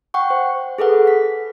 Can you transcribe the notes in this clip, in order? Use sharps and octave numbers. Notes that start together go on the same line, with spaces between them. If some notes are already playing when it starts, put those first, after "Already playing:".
F#5 G5 C#6
C5
G#4 A4 B4 F#5
B6